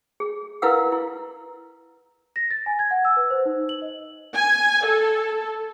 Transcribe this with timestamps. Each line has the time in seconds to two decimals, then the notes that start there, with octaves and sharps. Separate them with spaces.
0.20 G#4
0.62 E4 A#4 B4 F5 F#5 E6
0.92 E4
2.36 A#6
2.51 A6
2.66 G#5
2.79 G#6
2.91 F#5
3.05 E6
3.17 B4
3.30 C5
3.45 D#4
3.69 F#7
3.82 D#5
4.34 G#5
4.85 A4